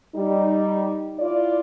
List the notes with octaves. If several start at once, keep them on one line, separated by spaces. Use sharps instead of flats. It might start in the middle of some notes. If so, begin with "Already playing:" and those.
G3 D#4
E4 F4 D5